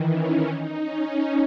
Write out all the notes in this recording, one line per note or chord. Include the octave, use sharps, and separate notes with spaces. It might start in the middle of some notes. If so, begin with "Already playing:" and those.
Already playing: D#3 E3
C#4
D#4
C#4